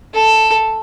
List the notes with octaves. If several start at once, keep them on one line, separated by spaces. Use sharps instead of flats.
A4